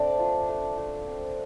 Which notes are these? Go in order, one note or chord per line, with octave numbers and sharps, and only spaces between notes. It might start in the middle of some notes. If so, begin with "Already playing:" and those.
Already playing: A3 C4 D4 D5
F4
A3
A3
C4